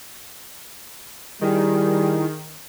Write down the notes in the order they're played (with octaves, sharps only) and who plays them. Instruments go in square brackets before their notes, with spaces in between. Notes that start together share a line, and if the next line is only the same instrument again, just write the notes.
[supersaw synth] D#3 [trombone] G3 [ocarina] E4 [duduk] G#4